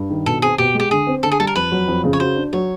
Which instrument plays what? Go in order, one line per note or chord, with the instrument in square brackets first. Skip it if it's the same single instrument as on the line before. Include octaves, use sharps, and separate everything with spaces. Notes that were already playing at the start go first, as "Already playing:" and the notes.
Already playing: [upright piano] G2
D#3
[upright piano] B2 [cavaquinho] A4
[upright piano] C4 [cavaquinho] G#4
[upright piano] B2 [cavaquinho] G4
[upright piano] G#3
[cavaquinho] G4
[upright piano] D3 [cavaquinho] G#4
[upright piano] C4
[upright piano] D3 [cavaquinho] A4
[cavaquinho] G#4
[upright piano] G3 [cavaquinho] A4
[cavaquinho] A#4
[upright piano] F2 [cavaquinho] B4
[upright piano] F#3
F2
C#3
[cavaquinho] C#5
[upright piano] F#4 [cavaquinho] C5
[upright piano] D4
[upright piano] F#3 [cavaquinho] C#5